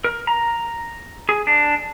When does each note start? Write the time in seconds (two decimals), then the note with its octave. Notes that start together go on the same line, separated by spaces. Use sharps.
0.04 A#4
0.27 A#5
1.29 G#4
1.47 D4